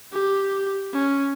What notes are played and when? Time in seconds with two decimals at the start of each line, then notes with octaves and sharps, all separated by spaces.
0.13 G4
0.93 C#4